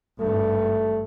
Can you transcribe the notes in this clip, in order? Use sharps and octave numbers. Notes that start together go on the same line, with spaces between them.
G#1 G2 A3